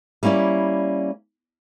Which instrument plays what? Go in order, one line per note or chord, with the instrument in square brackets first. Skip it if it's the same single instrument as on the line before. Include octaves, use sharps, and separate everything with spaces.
[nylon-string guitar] G3 A#3 C#4 E4 D5